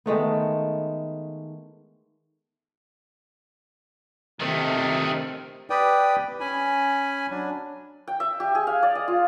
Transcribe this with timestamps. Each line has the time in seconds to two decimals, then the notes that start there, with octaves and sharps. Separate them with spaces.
0.06 D#3 G#3 A3 B3
4.41 C3 D#3 A3
5.70 G4 B4 D5 G5 D#6
6.40 C#4 G#5 B5
7.30 F#3 D4
8.08 G5
8.20 E5
8.40 G4
8.55 G#4
8.67 F5
8.83 D5
8.95 D#5
9.08 F4